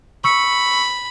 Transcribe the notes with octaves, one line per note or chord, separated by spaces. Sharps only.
B5 C#6 E6 C#7